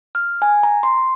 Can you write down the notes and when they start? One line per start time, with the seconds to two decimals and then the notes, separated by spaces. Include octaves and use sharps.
0.15 F6
0.42 G#5
0.63 A#5
0.83 C6